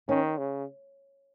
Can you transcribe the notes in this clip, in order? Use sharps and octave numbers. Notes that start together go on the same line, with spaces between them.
D#3 C#4
C#3